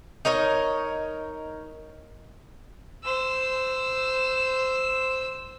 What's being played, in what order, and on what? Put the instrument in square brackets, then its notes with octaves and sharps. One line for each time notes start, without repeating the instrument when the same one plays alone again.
[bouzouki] D#4 A#4 C#5 D#5
[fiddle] C5 E6